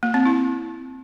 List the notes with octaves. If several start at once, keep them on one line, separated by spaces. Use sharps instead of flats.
A#3
C4
E4